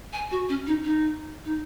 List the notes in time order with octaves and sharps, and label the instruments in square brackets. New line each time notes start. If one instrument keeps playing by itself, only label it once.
[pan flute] G#5
F#4
C#4
D#4
D#4
D#4